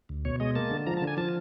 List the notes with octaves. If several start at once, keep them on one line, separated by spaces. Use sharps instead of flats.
D2
B2 C#5
G#3 D#5
A#3 A5
D3
F3 A#5
A5
D3
G#5
F3 A5